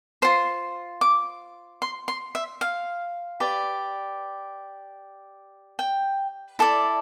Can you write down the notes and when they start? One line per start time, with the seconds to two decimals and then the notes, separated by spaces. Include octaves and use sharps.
0.22 F4 C5 C6
1.01 D6
1.82 C6
2.08 C6
2.35 E5
2.61 F5
3.40 G4 B4 D5
5.79 G5
6.59 E4 A4 D5